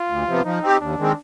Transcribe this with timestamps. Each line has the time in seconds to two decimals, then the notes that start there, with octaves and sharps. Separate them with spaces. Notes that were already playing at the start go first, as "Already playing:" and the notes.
Already playing: F4
0.09 D2
0.27 C3 F3 B3
0.45 F3 D#4
0.63 C4 G4
0.81 D#2 D4
0.98 D#3 G#3 C4